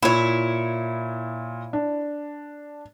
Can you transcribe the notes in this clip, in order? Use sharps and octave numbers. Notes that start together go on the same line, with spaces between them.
A#2 E4 C#5
D4